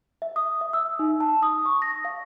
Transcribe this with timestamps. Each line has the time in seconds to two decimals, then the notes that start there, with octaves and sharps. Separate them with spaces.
0.22 E5
0.36 D#6
0.61 E5
0.73 E6
0.99 D#4
1.20 A5
1.43 D#6
1.66 C#6
1.82 A#6
2.05 F5